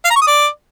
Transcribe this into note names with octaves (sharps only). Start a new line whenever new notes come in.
F5
A#5
C#6
D#6
D5